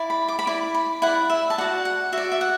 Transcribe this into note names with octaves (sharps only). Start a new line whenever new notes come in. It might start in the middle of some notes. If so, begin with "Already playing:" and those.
Already playing: E4 D5
B5
D6
B5
E4 D5 D6
B5
E4 D5 F#5
E5
A5
F#4 D5 F#5
F#5
F#4 D5 E5
E5
F#5